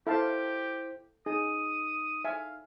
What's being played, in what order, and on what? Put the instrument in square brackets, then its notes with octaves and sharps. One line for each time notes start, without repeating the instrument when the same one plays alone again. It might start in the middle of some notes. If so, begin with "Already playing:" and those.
[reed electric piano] E4 C5 [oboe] G4 [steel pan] A4 F5 A5
[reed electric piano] D#4 [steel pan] G#4 [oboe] D#6
[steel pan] E5 G#5 [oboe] F5